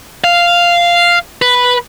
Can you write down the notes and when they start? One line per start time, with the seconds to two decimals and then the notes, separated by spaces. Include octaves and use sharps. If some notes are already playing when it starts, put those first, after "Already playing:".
0.24 F5
1.42 B4